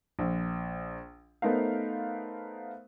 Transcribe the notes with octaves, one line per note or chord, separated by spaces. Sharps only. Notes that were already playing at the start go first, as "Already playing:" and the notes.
A#1
A3 B3 D#4 A#4 C5 F5